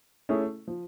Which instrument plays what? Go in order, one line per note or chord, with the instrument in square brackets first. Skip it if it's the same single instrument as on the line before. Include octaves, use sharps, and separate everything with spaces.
[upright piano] A3 C#4 E4 G#4
F3